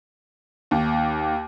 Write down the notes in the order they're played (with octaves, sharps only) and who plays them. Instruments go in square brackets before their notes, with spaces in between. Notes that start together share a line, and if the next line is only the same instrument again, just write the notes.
[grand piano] D#2